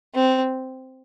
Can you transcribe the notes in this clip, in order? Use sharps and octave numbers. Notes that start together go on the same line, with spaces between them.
C4